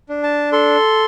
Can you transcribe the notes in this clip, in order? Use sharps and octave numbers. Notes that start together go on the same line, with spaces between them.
D4
A5
A4 C6